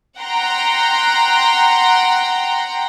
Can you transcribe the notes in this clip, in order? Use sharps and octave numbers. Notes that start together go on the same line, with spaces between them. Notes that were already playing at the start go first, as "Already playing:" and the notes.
F#5 G5 A#5 C6